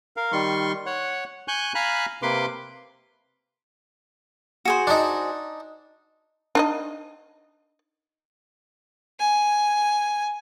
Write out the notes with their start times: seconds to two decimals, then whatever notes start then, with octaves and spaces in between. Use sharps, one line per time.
0.17 A#4 F5
0.32 D#3 G3 C6 C#6
0.86 C#5 F#5
1.48 G#5 C#6 F#6 G6
1.75 F5 G#5 A#5 B5 F#6
2.22 C3 A#3 B4 C6 D6
4.65 F#4 G#4 C5
4.87 D4 D#4
6.55 D4 D#4 D#5
9.20 G#5